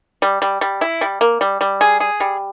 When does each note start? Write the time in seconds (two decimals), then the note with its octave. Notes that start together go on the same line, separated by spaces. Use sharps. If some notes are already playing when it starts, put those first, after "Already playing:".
0.22 G3
0.42 G3
0.61 G3
0.81 E4
1.01 G3
1.21 A#3
1.41 G3
1.61 G3
1.81 G#4
2.00 G#4
2.20 G3